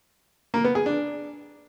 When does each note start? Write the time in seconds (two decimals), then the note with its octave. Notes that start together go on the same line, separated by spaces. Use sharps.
0.54 A#3
0.64 B3
0.75 G#4
0.86 D4